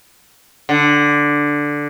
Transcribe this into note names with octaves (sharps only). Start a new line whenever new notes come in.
D3